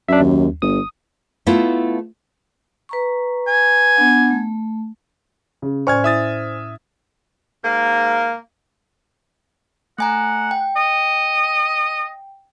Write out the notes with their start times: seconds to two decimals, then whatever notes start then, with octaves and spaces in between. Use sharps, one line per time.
0.08 F#2 D4 E5
0.20 D#2
0.62 G1 D#6
1.46 A3 B3 E4 F4
2.89 B4 A#5 C#6
3.48 G#5
3.96 B3 D4 F#5
4.30 A3
5.62 C#3
5.87 A2 C#4 C5 D5 G#5 C#6 F6 G#6
6.04 E4 E5 D#6 A6
7.64 G#2 A#3
9.98 A3 F#5 G#5 A#5
10.51 G5
10.76 D#5